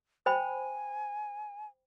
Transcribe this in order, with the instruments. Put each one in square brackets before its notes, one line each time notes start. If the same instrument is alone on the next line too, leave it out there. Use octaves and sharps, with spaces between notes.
[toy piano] C5 G5 B5 [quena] G#5